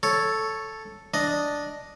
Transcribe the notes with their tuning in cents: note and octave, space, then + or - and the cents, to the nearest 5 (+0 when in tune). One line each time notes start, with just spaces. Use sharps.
A4 +0 C#5 +0
D4 +0 D#5 +0